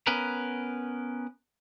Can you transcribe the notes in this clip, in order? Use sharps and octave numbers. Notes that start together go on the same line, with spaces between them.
B3 C#4 A#4 B4